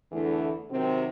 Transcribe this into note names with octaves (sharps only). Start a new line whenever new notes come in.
E2 D3 E3 A3
C3 D#3 F#3 C4